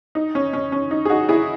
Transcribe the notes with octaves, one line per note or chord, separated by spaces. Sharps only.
D#4
C#4
C#4
C#4
D#4
G#4
D#4 F#4
E4 G#4